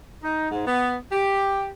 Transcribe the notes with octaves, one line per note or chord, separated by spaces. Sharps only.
D#4
G#2
B3
G4